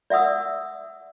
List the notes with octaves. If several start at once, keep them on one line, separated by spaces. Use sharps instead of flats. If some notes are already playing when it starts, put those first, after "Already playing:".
D5 E5 F#5 D#6 E6